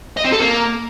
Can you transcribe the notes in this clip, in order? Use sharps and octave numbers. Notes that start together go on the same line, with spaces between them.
D#5
C4
A4
A#3